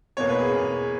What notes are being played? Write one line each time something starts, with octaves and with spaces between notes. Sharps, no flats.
E2 B2 A#3 C#5
B4
G#4
E2 B2 A#3